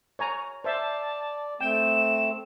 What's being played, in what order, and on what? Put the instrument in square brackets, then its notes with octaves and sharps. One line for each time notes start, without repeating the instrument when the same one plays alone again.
[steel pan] C#5 G#5 A#5
[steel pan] C5 E5 [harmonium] D5 [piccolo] A5
[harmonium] A3 C4 [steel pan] G5 [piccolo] E7